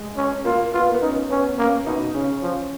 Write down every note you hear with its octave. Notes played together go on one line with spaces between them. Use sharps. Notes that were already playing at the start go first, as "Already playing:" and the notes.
Already playing: G#3
C#4
A#3 F4
B3 F4
A#3
B3
C#4 D#4
B3 C#4
A#3 C#4
B2 D#4
C#3 C#4
F3